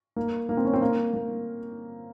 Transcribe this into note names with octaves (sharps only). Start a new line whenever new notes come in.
A#3
A#3
C4
C#4
C4
A#3
A#3